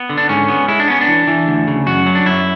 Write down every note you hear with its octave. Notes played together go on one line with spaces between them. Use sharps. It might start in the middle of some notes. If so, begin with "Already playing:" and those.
Already playing: B3
D3
D4
G#2 C#4
B3
G#3 E4
D4
B3 C#4
D4
E3
E3
D2
C#3
F#2 F#4
F#3
D4
F#2 E4